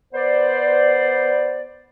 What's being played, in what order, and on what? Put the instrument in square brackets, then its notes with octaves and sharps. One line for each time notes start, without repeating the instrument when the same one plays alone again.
[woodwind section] B3 C5 D5